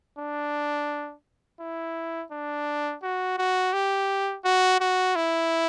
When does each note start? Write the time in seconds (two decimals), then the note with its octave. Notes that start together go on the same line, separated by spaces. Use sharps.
0.19 D4
1.61 E4
2.32 D4
3.03 F#4
3.38 F#4
3.73 G4
4.45 F#4
4.80 F#4
5.16 E4